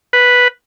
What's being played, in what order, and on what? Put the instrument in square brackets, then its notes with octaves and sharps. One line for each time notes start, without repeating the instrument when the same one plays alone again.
[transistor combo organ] B4